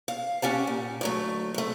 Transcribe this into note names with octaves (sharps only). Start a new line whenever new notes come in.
F5
C#4 G4 F#5 A5
A#2
D2 F#3 A3
C3 A3